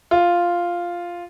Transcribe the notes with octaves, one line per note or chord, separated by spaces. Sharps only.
F4